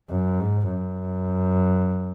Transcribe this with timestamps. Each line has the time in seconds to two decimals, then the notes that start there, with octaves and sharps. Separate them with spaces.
0.10 F#2
0.40 G#2
0.70 F#2